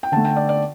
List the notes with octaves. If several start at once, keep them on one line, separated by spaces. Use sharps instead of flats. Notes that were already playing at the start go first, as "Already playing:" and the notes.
G5
D3 A3 A5
G5
D5
D5